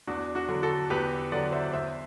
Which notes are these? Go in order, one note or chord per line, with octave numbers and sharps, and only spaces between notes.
E2 D4 F#4
D4 F#4
D3 F#3
F#4 A4
E2 G4 B4
D3 F#3 D5 F#5
C5 E5
E2 C5 E5